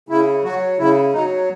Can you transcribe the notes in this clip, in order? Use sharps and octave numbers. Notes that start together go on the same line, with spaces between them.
C#3 E4
F#3 F#4
C#3 E4
F#3 D#4